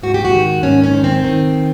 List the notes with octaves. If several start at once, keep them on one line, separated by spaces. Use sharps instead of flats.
G#2 F#4
G4
F#4
D#3
G#2 C#4
C#4
D#3
C4
D#3